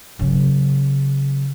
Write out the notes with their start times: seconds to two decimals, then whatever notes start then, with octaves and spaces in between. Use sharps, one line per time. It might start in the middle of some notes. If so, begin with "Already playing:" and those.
0.19 C#3 F#3